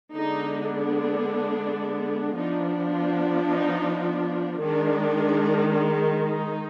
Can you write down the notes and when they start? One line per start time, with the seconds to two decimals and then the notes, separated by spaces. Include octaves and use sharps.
0.13 D3 G#3 B3 D4 D#4
2.36 F3 B3 D4 D#4
2.92 F4
3.48 D#4
4.60 D#3 G#3 D4
5.71 D4
6.27 D#4